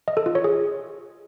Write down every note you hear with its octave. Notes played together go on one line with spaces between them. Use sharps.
D#5
A4
F4
C#5
G#4